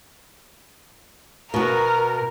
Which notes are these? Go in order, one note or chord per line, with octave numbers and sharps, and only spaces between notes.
B2 F#4 A#4